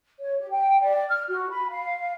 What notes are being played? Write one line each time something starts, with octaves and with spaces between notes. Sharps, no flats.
C#5
G4
G5
D5
F6
F#4
B5
F5